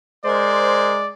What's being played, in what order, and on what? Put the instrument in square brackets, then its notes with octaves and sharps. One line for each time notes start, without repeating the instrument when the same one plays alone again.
[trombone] G#3 [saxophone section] A#4 C5 [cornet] D5